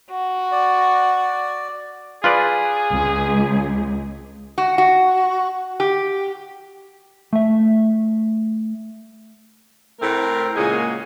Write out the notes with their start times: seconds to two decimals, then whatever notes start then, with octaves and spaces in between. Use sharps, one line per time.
0.11 F#4
0.52 D5
2.24 F4 G#4 B4 D5
2.91 C#2
4.58 F#4
4.78 F#4
5.80 G4
7.33 A3 E5
10.00 A2 A3 C4 A#4
10.55 A#2 C#3 G#3 A#3 F#4 G#4